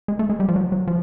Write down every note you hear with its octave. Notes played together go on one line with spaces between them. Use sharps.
G#3
A3
G#3
G3
F3
F#3
F#3
F3